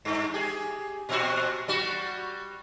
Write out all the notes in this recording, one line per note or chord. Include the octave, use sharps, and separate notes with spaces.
G2
G4 G#4
A#2 C4 F#4
G3 F#4